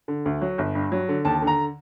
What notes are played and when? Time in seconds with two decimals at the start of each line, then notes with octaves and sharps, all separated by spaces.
0.08 D3
0.25 D2
0.42 F#3
0.58 G1
0.75 G2
0.92 F#3
1.09 D3
1.25 D#2 A5
1.42 D3
1.47 A#5